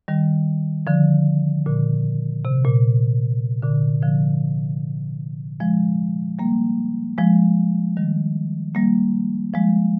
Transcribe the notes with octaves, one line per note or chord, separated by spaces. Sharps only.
D#3 G3
D3 F3
A#2 D3
C3
A#2
A#2 D3
D3 F3
F3 G#3
G3 A#3
F3 G#3
D#3 G3
G3 A#3
F3 G#3